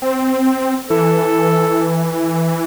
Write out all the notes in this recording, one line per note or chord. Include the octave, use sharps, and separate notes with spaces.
C4
E3 A4